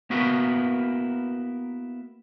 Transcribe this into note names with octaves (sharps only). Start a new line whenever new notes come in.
A#3 B3 E4 F#4 A#4 B4